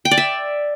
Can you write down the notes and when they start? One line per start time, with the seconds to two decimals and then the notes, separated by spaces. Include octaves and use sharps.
0.05 G5
0.11 D5
0.18 E5